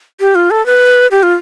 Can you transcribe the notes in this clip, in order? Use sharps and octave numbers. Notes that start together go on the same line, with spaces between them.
G4
F4
A4
B4
G4
F4